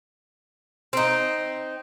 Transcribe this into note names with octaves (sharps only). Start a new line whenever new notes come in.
C4 D#4